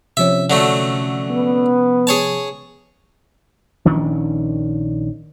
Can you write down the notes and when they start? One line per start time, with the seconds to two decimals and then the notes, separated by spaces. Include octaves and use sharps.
0.17 C3 F3 C#4 E5
0.50 D3 F#3 A3
1.30 B3
2.07 G#4 C#5 A5
3.85 A#1 D#3 C#4 D4